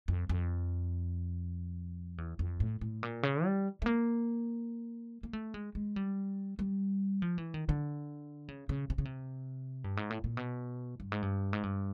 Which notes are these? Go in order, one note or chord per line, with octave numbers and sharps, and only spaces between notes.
F2
F2
E2
F2
A2
A2
A#2
C#3
G3
A3
A#3
A#3
A3
G#3
G#3
G3
G3
F3
E3
D#3
D3
C#3
C#3
C3
C#3
C3
G2
G#2
A2
A#2
B2
G2
G#2
G2
G#2
G2